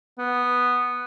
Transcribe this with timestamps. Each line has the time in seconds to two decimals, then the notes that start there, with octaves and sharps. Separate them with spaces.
0.19 B3